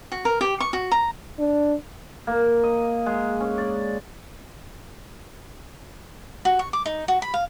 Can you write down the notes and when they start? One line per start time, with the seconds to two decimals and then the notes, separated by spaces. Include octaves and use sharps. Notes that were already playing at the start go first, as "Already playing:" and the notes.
0.12 F#4
0.25 A#4
0.41 G4
0.60 C#6
0.73 F#4
0.92 A#5
1.39 D4
2.27 A#3
2.63 D#5
3.06 G#3
3.40 C#4
3.58 D5
6.45 F#4
6.59 C#6
6.73 D6
6.86 D#4
7.08 F#4
7.22 B5
7.34 F5